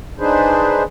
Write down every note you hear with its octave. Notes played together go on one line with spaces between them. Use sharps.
D4 D#4 G#4 B4 C5